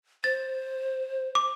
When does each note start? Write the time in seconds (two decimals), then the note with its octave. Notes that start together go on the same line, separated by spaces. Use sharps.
0.24 C5 A6
1.35 D6